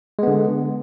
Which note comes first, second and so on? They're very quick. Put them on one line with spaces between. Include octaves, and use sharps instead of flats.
G#3 B3 D3